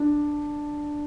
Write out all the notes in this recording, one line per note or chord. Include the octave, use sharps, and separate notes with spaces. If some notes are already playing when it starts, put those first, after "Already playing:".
Already playing: D4